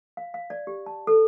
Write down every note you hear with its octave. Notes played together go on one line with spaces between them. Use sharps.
F5
F5
D5
G4
A5
A4